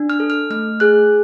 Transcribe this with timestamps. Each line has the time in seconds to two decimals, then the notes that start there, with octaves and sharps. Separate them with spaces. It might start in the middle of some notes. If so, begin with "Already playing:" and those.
Already playing: D4
0.10 F6
0.20 A4
0.30 F6
0.50 A3 F6
0.80 G#4 F#6